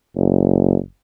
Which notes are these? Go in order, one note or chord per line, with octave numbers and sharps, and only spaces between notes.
F#1